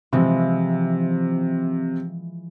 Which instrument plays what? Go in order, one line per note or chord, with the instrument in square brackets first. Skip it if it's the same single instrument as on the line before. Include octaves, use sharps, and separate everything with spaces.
[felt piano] C3 [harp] E3 F3 G#3